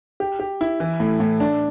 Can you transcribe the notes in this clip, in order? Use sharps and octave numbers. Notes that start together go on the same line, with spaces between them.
G4
G4
E4
E3
A2
A2
D4